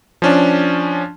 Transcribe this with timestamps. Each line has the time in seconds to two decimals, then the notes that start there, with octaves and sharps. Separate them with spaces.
0.22 F3 C#4 D4